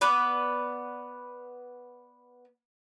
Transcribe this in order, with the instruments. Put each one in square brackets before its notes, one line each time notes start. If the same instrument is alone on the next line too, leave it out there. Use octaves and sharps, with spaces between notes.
[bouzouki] B3 B4 D5